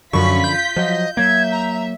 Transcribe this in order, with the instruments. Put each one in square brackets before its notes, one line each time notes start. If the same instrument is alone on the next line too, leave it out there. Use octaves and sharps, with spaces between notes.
[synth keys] F#2 C#6 [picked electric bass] D3 F3 [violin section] F4 B6 [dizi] B5
[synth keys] G6
[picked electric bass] F3 F#3 [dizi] D#5
[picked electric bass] F#3 A#3 [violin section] E5 [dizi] G#6
[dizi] A#5